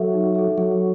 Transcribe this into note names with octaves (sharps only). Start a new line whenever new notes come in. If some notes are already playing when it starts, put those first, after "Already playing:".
Already playing: F#3 A4 E5
D#4
A4 E5
F#3 A4